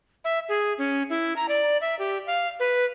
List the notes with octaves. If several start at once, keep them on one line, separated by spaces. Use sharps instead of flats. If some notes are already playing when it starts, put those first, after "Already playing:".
E5
G#4
C#4
E4
A#5
D5
E5
G4
F5
B4